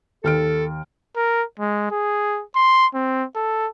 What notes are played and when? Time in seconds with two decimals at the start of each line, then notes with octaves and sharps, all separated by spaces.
0.24 D#2 A4 F6 D7
1.16 A#4
1.59 G#3
1.91 G#4
2.55 C6
2.94 C4
3.36 A4